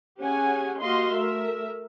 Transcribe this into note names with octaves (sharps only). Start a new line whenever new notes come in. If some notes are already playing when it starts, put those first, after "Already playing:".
C#4 G4 G#4 F#5 G#5
A#3 F#4 G4 D#5 F5 C6
A3 A#4 E5